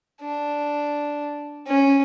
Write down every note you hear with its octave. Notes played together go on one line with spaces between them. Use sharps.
D4
C#4